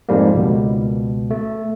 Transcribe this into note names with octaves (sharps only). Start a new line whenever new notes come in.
F2 G#2 G3 A#3
C#2 B2
A3